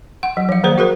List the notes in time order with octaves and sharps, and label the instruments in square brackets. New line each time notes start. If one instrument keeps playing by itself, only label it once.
[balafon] F#5
F#3
F3 F5
D#3 A#3 G#4 C5 D5
F#4 G#4 A#4 C5